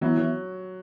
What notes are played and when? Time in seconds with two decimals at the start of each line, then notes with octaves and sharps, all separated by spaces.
0.01 E3 F#3 B3 E4
0.17 F#3